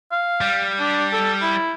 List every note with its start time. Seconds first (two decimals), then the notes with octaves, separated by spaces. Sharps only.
0.12 F5
0.41 G3
0.80 D4
1.13 A4
1.42 E4